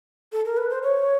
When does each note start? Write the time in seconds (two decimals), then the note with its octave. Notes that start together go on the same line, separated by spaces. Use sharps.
0.32 A4
0.45 A#4
0.57 B4
0.70 C5
0.83 C#5